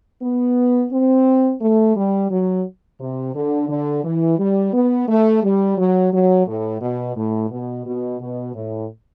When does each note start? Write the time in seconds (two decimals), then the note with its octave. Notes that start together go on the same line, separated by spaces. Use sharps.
0.22 B3
0.92 C4
1.61 A3
1.96 G3
2.30 F#3
3.00 C3
3.34 D3
3.69 D3
4.04 E3
4.39 G3
4.73 B3
5.08 A3
5.43 G3
5.78 F#3
6.13 F#3
6.47 A2
6.81 B2
7.16 A2
7.51 B2
7.86 B2
8.21 B2
8.55 A2